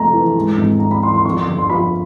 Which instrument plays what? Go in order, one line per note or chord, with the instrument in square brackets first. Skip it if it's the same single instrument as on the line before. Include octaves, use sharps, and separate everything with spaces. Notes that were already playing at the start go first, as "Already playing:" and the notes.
Already playing: [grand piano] F2 C3 A3 A#5
E3
G#2
G#1
G#1 A#5
B5
E3 C6
C6
F2 C#6
C6
G1
C6
F3 B5